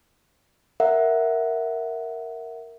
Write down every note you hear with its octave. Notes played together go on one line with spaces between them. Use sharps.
A#4 E5 F#5